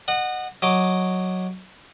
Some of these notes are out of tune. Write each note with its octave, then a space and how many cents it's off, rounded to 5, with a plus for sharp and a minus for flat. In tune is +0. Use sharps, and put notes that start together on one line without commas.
D#5 -30 F#5 +0
F#3 -5 D#5 +0 D6 +0